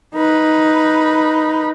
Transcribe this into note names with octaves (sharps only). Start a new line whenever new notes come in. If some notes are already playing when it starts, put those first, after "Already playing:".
D#4 B4